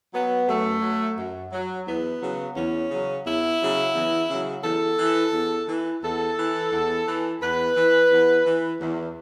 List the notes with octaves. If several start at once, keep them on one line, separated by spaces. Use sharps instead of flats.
F#3 B3
F#2 A3
F#3
F#2
F#3
E2 B3
C#3 F#3
E2 C#4
C#3 F#3
E2 E4
C#3 F#3
E2
C#3 F#3
E2 A4
E3
E2
E3
E2 A4
E3
E2
E3
E2 B4
E3
E2
E3
E2